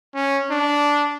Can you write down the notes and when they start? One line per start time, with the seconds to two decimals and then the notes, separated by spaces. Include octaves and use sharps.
0.14 C#4
0.50 D4